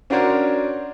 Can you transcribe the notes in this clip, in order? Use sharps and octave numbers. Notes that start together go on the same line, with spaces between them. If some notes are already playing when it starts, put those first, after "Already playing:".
C#4 D4 F#4 A#4 C5 C#5